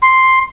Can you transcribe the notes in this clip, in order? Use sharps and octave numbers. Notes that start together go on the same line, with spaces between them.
C6